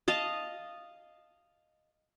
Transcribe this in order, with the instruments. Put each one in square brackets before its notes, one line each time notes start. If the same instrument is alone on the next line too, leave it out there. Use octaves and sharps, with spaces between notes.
[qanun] D#5 F5 A5